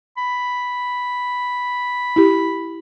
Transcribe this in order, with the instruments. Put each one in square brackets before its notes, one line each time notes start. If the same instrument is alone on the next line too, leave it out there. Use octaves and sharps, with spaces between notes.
[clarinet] B5
[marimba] E4 G4